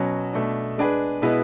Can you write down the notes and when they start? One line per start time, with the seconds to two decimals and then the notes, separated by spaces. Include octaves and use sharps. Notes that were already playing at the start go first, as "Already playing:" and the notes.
Already playing: B2 F#3 C#4
0.33 B2 A3 D4
0.78 G#3 D4 G#4 B4
1.22 B2 G#3 B3 E4 B4